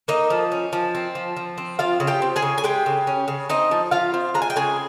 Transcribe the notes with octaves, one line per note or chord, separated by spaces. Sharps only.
A#3 D#4 D#5
F3
C#4
F3
C4
F3
F3
C4
F3 F4 F5
C#3
G4 G5
C4
G#4 G#5
C#3
G#5
G#3 G4 G5
C#3
C#4
C#3
C4 D#4 D#5
F3
F3 F4 F5
C4
G#3 A#5
G#5
G5
C#3 G#4 G#5